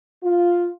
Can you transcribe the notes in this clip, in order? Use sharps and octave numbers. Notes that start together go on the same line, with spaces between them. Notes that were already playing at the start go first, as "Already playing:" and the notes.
F4